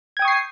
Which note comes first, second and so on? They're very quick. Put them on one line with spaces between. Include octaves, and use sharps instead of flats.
G#6 G5 D#6 C#6 C7